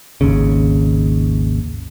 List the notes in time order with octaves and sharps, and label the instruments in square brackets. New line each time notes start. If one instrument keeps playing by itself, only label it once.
[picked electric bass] G#1 D#2 C#3